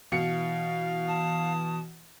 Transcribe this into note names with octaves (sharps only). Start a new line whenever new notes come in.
B2 E3 F5 C#7
A5 D#6